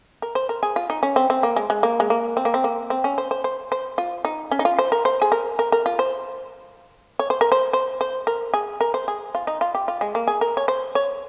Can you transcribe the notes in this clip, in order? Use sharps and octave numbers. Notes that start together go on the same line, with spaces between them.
A#4
C5
A#4
G#4
F4
D#4
C#4
C4
C4
A#3
G#3
G#3
A#3
G#3
A#3
C4
A#3
C4
A#3
C4
C#4
C5
C5
C5
C5
F4
D#4
C#4
D#4
F4
C5
A#4
C5
G#4
A#4
A#4
A#4
F4
C5
C#5
C5
A#4
C5
C5
C5
A#4
G#4
A#4
C5
G#4
F4
D#4
F4
G4
F4
G#3
A#3
G#4
A#4
C#5
C5
C#5